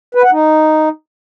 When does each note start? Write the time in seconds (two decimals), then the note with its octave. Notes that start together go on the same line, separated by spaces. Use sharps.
0.15 B4
0.23 F#5
0.32 D#4